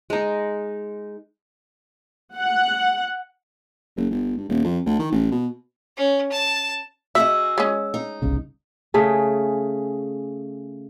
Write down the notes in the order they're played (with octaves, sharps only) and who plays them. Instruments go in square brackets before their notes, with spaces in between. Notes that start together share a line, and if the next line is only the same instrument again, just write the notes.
[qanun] G#3 D#4
[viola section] F#5
[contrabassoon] F#1
G1
G2
D#1
F2
D2
D#3
A1
B2
[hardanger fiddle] C#4
A5
[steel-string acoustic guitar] F#4 G#4 D#5 [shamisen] E5 [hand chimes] E6
[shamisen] G#3 C#4
[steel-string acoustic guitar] D#4
[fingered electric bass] G1 C2 C#3
[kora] C#3 A3 G#4